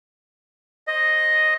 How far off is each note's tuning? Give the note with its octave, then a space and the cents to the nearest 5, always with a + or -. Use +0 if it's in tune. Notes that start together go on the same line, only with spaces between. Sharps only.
C5 +25 D#5 +0